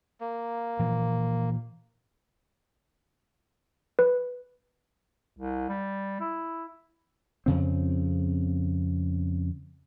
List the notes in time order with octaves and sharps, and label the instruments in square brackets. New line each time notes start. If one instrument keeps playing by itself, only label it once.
[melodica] A#3
[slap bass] A#2 E3 F3
[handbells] B4
[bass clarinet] C2
G3
E4
[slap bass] F2 C#3 C4